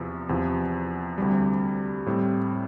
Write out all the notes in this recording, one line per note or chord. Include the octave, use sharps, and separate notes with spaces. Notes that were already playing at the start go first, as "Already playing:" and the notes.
Already playing: E2 C3 F3
E2 C3 F3
D2 C3 G3
A2 G3 C4